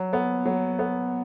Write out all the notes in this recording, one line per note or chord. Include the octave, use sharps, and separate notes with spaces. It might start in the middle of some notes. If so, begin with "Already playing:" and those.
Already playing: F#3
B3
F#3
B3